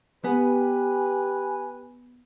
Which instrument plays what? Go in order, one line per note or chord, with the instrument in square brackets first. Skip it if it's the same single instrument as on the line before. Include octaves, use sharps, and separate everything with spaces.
[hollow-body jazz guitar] B3 [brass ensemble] G4 B4 [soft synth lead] G#5